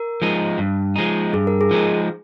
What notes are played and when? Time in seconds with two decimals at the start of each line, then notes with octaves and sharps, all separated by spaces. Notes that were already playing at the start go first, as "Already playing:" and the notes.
Already playing: A#4
0.22 F3 G#3 D#4
0.58 G2
0.96 F3 G#3 D#4
1.33 G2 G#4
1.47 A#4
1.61 G#4
1.71 F3 G#3 D#4